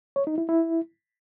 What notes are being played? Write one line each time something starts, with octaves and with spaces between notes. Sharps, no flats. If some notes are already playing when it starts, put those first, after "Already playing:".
C#5
D#4
E4
E4